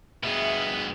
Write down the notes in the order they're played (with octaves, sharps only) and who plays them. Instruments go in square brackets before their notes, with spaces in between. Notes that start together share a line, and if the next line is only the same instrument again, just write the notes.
[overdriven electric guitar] G2 B2 [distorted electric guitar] B3 [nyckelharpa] G#4 [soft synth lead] E5